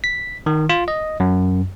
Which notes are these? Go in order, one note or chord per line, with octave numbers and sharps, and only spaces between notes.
B6
D#3
F4
D#5
F#2